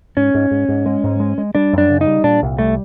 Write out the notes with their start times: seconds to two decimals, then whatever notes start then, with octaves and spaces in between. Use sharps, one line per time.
0.16 G#2 C#4
0.34 G#2
0.51 G#2
0.69 G#2
0.86 G#3
1.04 G#2
1.20 G#3
1.38 G#3
1.55 G3 D4
1.73 F#2
1.78 D4
1.90 C#3
2.01 D#4
2.06 G3
2.24 A#2 D4
2.42 C2
2.58 G3 A3